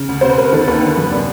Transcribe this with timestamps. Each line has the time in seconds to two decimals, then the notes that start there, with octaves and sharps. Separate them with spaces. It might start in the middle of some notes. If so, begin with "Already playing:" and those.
Already playing: C#3
0.09 D2
0.21 C3 C5
0.30 B4
0.38 D2 A#4
0.52 D#3 A4
0.68 D#2 B4
0.82 D3
0.97 F#2
1.11 C3 D5